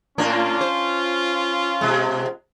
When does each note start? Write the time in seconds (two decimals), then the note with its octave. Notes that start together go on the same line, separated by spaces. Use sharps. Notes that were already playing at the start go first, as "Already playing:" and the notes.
0.18 A2 A#3 C#4 D4 F4
0.61 C5
1.81 B2 G#3